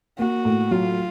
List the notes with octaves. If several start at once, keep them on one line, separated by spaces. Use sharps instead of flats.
A#3 F#4
A2
F#3 F4